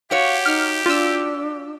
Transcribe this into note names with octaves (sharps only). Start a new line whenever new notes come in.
F#4 G4 C#5 F5
D#4 F6
D4 F4 E6